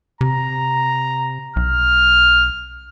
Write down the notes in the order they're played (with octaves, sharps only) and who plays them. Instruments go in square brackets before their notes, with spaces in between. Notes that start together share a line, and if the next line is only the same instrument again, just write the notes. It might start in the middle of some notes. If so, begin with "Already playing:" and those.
[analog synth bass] C3 [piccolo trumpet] A#5
[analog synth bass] B1 [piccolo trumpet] F6